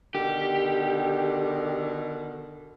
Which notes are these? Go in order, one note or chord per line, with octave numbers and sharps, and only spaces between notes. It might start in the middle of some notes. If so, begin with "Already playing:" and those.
B2 D3 D#3 G4